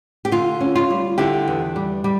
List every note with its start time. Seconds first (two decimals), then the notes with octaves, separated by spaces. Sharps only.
0.25 G4
0.31 D3 F4
0.60 C#4
0.75 F4
0.90 G3
1.18 D3 E4 G4
1.48 E2
1.76 G3
2.04 G3